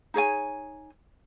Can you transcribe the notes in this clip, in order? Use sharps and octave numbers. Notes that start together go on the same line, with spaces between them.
D#4 G#4 C#5 G#5